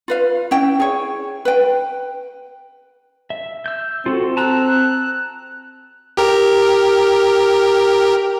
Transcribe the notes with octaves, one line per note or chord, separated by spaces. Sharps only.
F4 B4 F5
C#4 E4 G5
G#4 C#5
B4 G5
E5
E6 G6
C4 F4 F#4 A4
A5 A#5 E6 F#6
G4 A#4